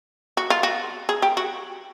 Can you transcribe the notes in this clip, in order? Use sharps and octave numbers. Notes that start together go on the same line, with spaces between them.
F#4
F4
F#4
G#4
G4
F#4